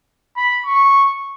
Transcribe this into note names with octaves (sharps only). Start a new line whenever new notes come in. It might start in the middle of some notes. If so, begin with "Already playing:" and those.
B5
C#6